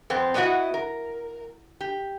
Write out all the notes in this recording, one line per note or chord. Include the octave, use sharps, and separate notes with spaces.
F2 B3 C4
B3 C#4 D4 E4 F#4 D#5
A#4
G4